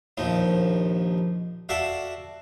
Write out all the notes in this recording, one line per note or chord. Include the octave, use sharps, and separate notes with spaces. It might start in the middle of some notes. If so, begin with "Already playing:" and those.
A#1 D#2 F3 D#4
F#4 A4 D5 E5 F5